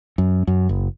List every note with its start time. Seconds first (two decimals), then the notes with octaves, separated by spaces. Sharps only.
0.18 F#2
0.47 F#2
0.69 F#1